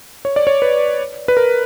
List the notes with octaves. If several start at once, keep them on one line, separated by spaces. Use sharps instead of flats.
C#5
D5
C#5
B4
B4
A#4